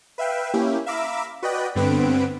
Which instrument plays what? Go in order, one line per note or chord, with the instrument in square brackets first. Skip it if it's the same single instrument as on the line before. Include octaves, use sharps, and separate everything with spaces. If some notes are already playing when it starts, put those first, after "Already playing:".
[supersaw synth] B4 E5 F5 G5
A#3 C#4 E4 G4
E5 F5 A#5 B5 D6 E6
F#4 B4 D5 D#5 G5 F#6
G2 D3 B3 C4 B4 D7